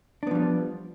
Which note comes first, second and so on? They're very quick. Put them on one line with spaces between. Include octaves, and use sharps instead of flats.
D4 B3 F3 G3